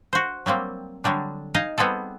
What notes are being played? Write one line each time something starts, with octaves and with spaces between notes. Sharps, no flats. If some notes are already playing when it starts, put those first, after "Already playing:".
F#4 C5
F#3 G3 A#3 C4
D3 F#3 G3 D4
D#4 D#5 F5 G#5
G3 B3 C4 G#4 A4